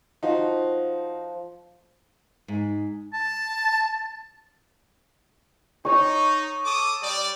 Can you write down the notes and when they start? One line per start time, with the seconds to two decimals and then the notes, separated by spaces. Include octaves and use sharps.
0.23 F3 D#4 F#4
2.48 G#2
3.14 A5
5.85 D#4 C#5 C#6
6.65 A4 D6 D#6
7.01 G3 D5